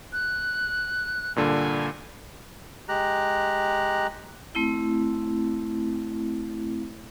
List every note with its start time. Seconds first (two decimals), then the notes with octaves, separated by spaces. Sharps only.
0.12 F#6
1.36 G2 A#2 D3 G#5
2.89 G#3 G4 A#5 F#6
4.55 A3 C4 E4